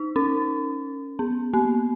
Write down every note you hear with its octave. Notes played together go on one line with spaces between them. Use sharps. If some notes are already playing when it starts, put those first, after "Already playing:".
Already playing: D#4
C#4
B3
A#3